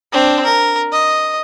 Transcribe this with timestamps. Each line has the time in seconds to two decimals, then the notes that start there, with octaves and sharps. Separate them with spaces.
0.12 C4 D4
0.44 A#4
0.92 D#5